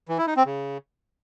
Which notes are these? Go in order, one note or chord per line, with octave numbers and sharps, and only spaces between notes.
E3
E4
D#4
C4
C#3